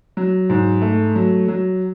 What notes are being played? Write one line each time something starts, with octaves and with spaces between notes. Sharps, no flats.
F#3
G#2
A3
F#3
F#3